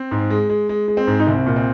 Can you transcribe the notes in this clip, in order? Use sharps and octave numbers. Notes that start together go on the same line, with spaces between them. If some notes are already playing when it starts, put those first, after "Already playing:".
Already playing: C4
G#2
G#3
G#3
G#3
G#3
C4
G#2
D#4
C2 C4
A#2
C4